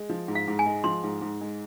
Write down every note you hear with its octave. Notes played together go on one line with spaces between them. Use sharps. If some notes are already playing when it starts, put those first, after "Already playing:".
Already playing: G#3
F3
G#2
F5
G#2
G#5
G#3
F3 C6
G#2
G#2
G#3